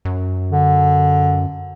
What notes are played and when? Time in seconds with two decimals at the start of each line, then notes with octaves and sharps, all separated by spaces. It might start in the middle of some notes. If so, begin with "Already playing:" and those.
0.05 F#2
0.51 D3